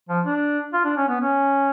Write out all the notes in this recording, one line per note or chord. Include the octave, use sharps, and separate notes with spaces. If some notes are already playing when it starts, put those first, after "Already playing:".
F3
D4
F4
D4
C#4
B3
C#4